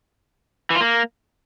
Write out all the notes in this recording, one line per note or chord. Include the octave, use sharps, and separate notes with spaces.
E3
F4
A#3